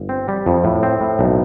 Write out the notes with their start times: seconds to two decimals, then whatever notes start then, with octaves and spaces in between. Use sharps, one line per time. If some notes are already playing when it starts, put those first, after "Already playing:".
Already playing: G1
0.09 C4
0.28 G3
0.46 F2
0.64 A2
0.83 C4
1.01 A2
1.19 B1